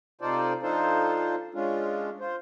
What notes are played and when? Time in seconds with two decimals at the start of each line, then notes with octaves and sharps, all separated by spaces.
0.21 C3 D#4 F4 A4 C5 D5
0.62 F3 D4 D#4 F4 A4 C5
1.54 G#3 C#4 D4 F4
2.20 F4 C5